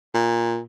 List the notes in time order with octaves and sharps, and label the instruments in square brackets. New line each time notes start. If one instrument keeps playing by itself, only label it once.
[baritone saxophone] A#2